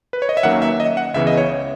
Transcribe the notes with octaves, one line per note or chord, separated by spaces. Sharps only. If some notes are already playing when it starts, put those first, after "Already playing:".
B4
C#5
D#5
E5
D#2 D#3 F#3 A#3 C#4 F#5
E5
D#5
F#5
C#2 C#3 E3 B3 E5
D#5
C#5